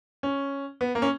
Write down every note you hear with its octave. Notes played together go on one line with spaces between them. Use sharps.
C#4
B3
A#3
C#4